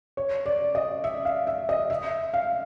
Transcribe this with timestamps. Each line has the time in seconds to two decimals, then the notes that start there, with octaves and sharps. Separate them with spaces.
0.17 C#5
0.46 D5
0.75 D#5
1.04 E5
1.25 F5
1.47 E5
1.69 D#5
1.90 E5
2.34 F5